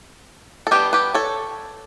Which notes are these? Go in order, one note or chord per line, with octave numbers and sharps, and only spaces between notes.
A4
G3 B3 D4 G4 B4
G4 B4
A4 C#5